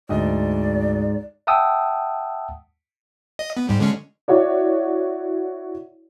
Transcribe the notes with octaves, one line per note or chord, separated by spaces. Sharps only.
D2 G#2 D5 D#5
E5 F#5 G5 A5 D#6 E6
D#5
B3
G#2 G3
D3 G#3 C#4
E4 F#4 C#5 D5